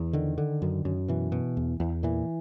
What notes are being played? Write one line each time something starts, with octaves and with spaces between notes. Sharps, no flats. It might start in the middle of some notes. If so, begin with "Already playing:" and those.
Already playing: E2
D3 D#3
D3
F#2
F#2
B2 E3
B2
E2
E2
A#2 E3